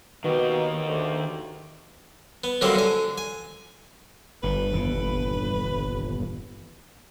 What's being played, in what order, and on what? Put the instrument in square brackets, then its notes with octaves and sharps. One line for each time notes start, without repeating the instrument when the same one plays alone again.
[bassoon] B2 [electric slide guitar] D#3 G4
[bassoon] D2
[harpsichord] B3
D3 F#3 G3 A3 A#3 C4
D3 G#5
G#5
[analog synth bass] G1 [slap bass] G2 [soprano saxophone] B4
[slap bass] D#1 E2 C#3